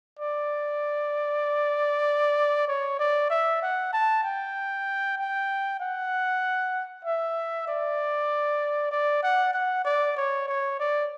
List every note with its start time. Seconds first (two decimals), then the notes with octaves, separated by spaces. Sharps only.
0.19 D5
2.68 C#5
2.99 D5
3.30 E5
3.62 F#5
3.93 A5
4.24 G5
5.18 G5
5.80 F#5
7.05 E5
7.68 D5
8.91 D5
9.23 F#5
9.54 F#5
9.85 D5
10.17 C#5
10.48 C#5
10.79 D5